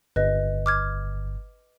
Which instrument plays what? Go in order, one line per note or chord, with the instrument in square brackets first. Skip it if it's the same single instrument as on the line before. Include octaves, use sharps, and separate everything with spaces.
[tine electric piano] G1 [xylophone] B4 D#5
[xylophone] D6 F6 G#6